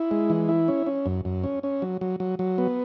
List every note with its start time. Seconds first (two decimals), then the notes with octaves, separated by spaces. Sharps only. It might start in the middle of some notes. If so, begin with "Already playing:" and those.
Already playing: E4
0.11 G#3
0.30 E3
0.49 E4
0.68 C#4
0.87 C#4
1.06 F#2
1.25 F#2
1.44 C#4
1.63 C#4
1.82 F#3
2.01 F#3
2.20 F#3
2.39 F#3
2.58 B3